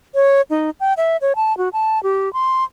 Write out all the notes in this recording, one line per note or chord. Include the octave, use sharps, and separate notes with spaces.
C#5
D#4
G5
E5
C#5
A5
F#4
A5
G4
C6